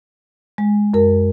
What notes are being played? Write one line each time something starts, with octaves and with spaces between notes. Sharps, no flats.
G#3
F#2 A#4